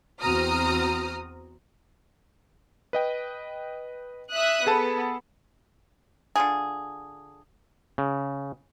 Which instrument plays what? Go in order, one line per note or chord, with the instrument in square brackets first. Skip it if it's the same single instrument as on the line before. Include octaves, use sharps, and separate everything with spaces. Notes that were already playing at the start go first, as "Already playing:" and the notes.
[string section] E2 C4 F#4 A#5 D#6 F6
[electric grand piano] B4 D#5 G5
[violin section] E5 D#6 F#6
[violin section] B3 [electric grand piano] G#4 A4 A5
[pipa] D3 F4 G#4
[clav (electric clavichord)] C#3